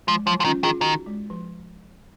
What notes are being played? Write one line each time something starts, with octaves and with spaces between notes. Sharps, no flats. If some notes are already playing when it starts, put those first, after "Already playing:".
F3 G#3
F3 F#3
F3
D#3 C#4 F4
D#3 F4 G#4
D#3 D#4 F#4
G#3
F3